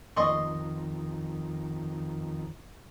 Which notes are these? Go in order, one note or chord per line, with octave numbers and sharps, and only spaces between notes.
F2 D#3 D#5 C6 C#6